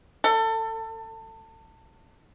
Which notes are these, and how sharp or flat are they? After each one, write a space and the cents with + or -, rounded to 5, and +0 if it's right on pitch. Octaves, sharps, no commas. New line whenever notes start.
A4 +25